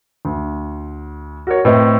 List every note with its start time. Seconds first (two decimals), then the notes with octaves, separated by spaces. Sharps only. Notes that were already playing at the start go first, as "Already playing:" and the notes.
0.25 D2
1.47 F#4 A#4 C#5
1.65 A2 C4 B4 D#5 E5